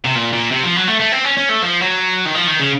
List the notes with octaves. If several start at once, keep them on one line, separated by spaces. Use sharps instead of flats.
C3
A#2
A#2
C3
F3
F#3
A3
A3
C4
C#4
C#4
A3
F3
F#3
D#3
F3
D#3
C#3